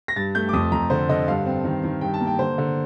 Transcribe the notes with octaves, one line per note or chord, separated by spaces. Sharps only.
A#6
G2 A6
A3 G6
D6
F2 D#6
F2 A#5
D3 C5
D3 D#5
G2 F5
C4
D#3
D#3
G2 G5
A5
A#3
G5
D3 C5
D3